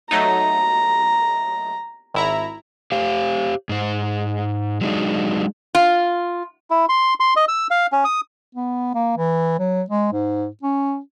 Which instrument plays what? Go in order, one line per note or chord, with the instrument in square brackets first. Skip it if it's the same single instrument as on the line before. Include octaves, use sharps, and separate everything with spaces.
[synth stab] F#3 A3 D#4 [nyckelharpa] A#5
[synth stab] G#1 E4 A#5
[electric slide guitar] G4 C5 F5
G#2 C5
F#3 G#3 D4 D#4
[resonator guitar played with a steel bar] F4
[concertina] E4
C6
C6
D#5
E6
F5
C#4
D#6
[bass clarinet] B3
A#3
E3
F#3
G#3
G#2
C#4